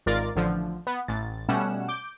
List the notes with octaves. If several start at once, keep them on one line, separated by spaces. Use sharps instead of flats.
G#1 G#2 F4 A#4 D5 A6
A1 D3 F3
B3
A1 A6
B2 G3 A3 C#4 F#5 E7
D6 G6 D7